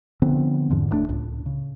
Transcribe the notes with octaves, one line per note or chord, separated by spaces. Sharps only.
D3 F3 B3 C4
E2 G#2 D3 F3
D1 G2 A3 D4
C#2 A2
C#3